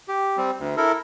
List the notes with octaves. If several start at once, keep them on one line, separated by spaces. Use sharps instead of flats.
G4
G3 C4
D2
E4 A4 A#4